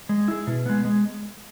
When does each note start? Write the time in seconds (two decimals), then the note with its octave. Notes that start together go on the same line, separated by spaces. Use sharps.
0.09 G#3
0.28 E4 G#4
0.47 B2
0.66 G#3 B3
0.85 G#3